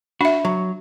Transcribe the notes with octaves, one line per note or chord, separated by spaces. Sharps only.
D4 F#4 E5
F#3